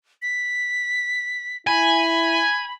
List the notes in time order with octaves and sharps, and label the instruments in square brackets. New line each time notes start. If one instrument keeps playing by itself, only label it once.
[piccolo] B6
[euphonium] E4 [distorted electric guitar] G#5 [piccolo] B5